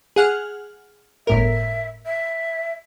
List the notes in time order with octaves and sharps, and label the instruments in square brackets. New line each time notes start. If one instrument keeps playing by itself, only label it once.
[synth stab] G#4 F#5 F6
[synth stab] G1 A2 A#4 [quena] E5
[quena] E5